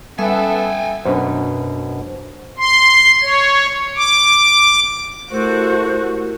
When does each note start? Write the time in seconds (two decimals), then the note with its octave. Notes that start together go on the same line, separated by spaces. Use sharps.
0.19 G3 B3 A4 E5 G5 G#5
1.05 F#2 B2 D4 C5
2.58 C6
3.22 C#5
3.96 D6
5.31 A3 E4 F#4 G4 A#4 C5